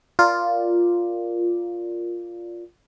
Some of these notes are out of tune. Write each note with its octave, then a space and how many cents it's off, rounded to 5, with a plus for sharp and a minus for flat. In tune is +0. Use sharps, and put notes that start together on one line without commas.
F4 +0 A#4 +0 D5 +0